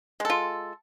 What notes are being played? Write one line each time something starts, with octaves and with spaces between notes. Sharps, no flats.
G#3 F4 A4